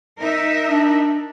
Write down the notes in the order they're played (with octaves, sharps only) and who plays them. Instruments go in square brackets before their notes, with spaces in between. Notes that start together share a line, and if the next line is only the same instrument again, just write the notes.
[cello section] D#4 A#4 E5
[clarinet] D4